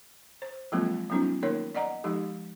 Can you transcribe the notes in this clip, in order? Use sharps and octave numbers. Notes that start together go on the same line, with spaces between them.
C5
F3 F#3 G#3 A#3 C4 F4
F#3 G3 B3 C#4 D#4 F4
D#3 A#3 D#4 A#4 C#5
D5 D#5 F#5 A#5
F3 G#3 D#4 G4